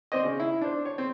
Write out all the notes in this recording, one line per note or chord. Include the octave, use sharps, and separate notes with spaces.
C4 C5 D5 D#5
C#3
E4
D4 C5
C#5
C4